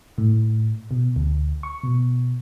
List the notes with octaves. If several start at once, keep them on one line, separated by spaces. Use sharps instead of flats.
A2
B2
D2
C#6
B2